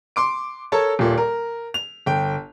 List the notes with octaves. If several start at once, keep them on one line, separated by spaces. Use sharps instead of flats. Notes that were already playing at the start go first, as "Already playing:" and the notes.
C6 D6 D7
A4 A#4 C#5 A5
D#1 A#2
A#4
F7
G1 G5